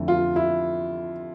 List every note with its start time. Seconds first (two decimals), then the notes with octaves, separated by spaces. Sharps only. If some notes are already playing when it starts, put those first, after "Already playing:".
Already playing: F2 D3 A3 E4
0.08 F4
0.36 E4